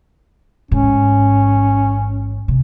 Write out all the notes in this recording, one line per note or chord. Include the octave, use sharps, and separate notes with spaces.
A1 G#2 C#4
C3